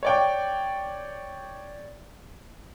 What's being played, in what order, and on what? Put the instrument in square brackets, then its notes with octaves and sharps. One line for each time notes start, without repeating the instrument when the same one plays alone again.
[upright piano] C#5 D5 G5